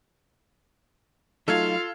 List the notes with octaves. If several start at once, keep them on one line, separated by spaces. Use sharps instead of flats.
F#3 A3 D#4 F4 A4 F5 F6 G#6